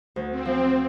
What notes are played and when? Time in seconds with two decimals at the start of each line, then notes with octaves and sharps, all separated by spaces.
0.16 D2
0.31 C4
0.46 F3